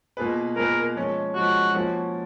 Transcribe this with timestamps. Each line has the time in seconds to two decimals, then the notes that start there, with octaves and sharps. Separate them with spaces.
0.17 B2 A#3 F4 G#4 B4
0.56 B2 A#3 F4 G#4 A#4 B4
0.96 F3 G#3 C#4
1.35 F3 G#3 C#4 F#4
1.74 F3 A#3 C#4 F#4